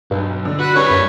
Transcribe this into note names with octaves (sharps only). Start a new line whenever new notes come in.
B1 G2
D3
F#4 B4
G3 C#4 D4 B4 C#5
F#2